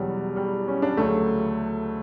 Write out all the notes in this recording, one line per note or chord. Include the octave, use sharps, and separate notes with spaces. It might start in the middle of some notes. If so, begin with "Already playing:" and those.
Already playing: E2 B2 F#3 G3
G3
C#4
D4
D2 C#3 F#3 A3